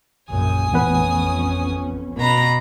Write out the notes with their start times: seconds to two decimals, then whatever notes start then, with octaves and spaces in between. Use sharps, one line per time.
0.29 A#1 F#2 C#3 G#5 D#6
0.73 A1 F2 B3 C#4 B4
2.19 B2 A#5 B5